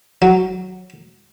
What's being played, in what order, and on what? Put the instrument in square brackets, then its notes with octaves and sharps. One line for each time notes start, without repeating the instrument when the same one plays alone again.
[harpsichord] F#3